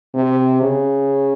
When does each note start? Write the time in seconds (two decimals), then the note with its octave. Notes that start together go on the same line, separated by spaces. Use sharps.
0.14 C3
0.62 C#3